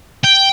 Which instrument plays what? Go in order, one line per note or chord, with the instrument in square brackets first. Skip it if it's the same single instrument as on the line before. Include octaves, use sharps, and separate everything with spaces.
[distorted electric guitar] G5